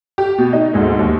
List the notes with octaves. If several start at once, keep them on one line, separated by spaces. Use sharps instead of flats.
G4
B2
D#4
D2 G#2 G#3 A3
D#2